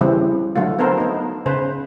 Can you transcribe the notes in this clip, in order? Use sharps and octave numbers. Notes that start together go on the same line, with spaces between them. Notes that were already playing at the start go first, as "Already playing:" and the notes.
C#3 E3 G3 C4
D3 F#3 A3 F4
B3 C4 A4 A#4 C5
B3 D#4
C#3 B4 C5